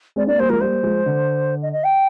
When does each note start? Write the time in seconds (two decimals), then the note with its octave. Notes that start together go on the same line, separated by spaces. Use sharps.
0.16 G#3 C4 D5
0.27 A#3 D4 D5
0.38 G3 A#3 C5
0.49 F3 G#3 A#4
0.60 G3 A#3 C5
0.83 F3 G#3
1.06 D3
1.62 D#5
1.72 D#5
1.83 G5